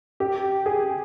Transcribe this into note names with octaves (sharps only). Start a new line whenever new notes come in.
G4
G#4